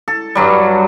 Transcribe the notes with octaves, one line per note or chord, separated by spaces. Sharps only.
A4
G2 F#3 G3